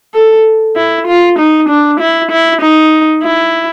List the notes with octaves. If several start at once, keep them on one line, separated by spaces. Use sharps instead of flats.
A4
E4
F4
D#4
D4
E4
E4
D#4
E4